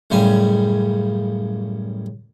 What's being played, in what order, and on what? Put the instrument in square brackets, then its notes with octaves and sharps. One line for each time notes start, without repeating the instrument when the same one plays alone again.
[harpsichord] A1 F#2 C#3 G3 G#5